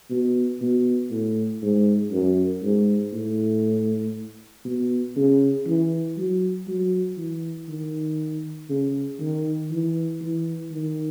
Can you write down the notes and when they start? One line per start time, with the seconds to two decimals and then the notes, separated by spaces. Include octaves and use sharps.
0.10 B2
0.61 B2
1.11 A2
1.62 G#2
2.12 F#2
2.63 G#2
3.13 A2
4.65 B2
5.16 C#3
5.66 E3
6.17 F#3
6.67 F#3
7.17 E3
7.68 D#3
8.69 C#3
9.20 D#3
9.71 E3
10.21 E3
10.71 D#3